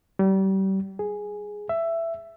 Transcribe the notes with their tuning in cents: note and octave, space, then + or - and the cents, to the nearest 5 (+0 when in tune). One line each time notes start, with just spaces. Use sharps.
G3 -30
G#4 +0
E5 +15